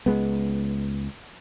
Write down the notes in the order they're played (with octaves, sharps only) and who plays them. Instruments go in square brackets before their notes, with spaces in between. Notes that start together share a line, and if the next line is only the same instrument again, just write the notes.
[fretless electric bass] C#2 G#3 B3